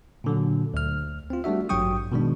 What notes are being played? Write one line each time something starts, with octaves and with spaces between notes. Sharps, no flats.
A#2 D3 F#3
D2 F6
C4 F4
G3 A3 D4 F#4 E5
A1 G2 F#3 G5 C#6 D#6
B2 D#3 G#3 D4